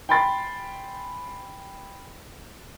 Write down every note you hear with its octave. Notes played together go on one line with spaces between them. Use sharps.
G5 G#5 B5 C6 A6